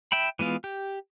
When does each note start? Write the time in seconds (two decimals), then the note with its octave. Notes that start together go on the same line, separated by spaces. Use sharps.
0.12 E5 G5 B5
0.39 E3 G#3 B3 F4
0.64 G4